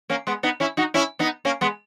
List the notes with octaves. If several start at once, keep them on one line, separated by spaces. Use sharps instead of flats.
A#3 C#4
G#3 B3
B3 D#4
C#4 E4
D#4 F#4
C#4 E4
B3 D#4
A#3 C#4
G#3 B3